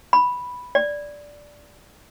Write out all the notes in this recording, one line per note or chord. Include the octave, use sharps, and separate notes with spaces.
B5
D5